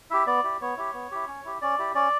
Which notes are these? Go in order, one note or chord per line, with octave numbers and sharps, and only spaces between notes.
E4 G4 E5
B3 D5
E4 G4
B3 C#5
E4 G4
B3
E4 G4
C#4
E4 G4
C#4 D5
E4 G4
C#4 D5